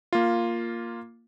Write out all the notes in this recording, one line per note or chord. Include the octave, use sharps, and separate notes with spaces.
A#3 F4